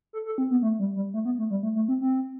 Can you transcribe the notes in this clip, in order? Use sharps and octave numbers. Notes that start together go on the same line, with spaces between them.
A4
A4
C4
B3
A3
G3
G3
A3
B3
A3
G3
A3
A3
C4
C4